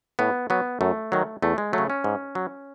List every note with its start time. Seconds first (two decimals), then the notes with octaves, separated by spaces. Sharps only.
0.19 A2 B3
0.50 F#3 B3
0.81 F#2 A3
1.12 D#3 F#3
1.42 E2 A3
1.58 G#3
1.73 C#3 F#3 A3
1.90 C#4
2.04 G#2
2.35 F#3